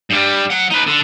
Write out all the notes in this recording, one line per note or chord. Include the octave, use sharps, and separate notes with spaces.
G2 G3
F#3 F#5
D#4 B4
D3